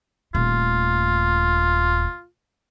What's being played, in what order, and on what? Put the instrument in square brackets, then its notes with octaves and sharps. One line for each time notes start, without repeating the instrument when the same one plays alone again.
[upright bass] D#1 A3 [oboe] F4